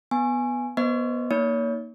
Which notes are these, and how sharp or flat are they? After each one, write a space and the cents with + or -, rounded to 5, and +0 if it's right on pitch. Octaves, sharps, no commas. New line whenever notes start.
B3 +0 G#5 +0
B3 -20 C5 +0 D#5 +0
A#3 +0 D#4 +0 C#5 +35